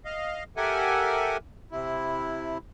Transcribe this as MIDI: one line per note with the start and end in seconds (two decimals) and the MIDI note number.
0.05 0.44 75
0.05 0.44 77
0.57 1.37 67
0.57 1.37 69
0.57 1.37 70
0.57 1.37 76
0.57 1.37 78
0.57 1.37 80
1.71 2.58 48
1.71 2.58 64